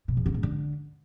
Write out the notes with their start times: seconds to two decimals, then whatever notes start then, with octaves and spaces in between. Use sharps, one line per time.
0.08 B2
0.17 E2
0.26 C#3
0.34 G#2
0.43 D3